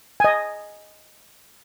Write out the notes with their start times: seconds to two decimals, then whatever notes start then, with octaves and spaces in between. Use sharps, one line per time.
0.20 D#5 G#5